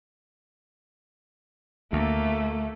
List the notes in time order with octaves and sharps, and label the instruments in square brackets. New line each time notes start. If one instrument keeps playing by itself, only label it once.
[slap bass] D2 [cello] A3 [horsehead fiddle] A#3